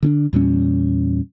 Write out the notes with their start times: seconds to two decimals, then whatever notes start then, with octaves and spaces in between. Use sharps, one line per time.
0.03 D3 C#4 D4
0.33 E2 A#2 G3 C#4